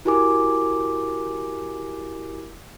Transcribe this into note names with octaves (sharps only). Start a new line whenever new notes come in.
E4 F#4 G4 A#4 G#5 D6